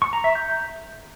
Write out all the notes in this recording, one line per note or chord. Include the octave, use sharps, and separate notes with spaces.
C#6
A#5
E5
G6